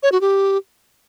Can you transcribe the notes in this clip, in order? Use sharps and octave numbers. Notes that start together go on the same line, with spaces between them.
C#5
F#4
G4